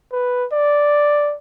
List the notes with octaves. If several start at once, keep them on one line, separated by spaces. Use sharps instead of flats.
B4
D5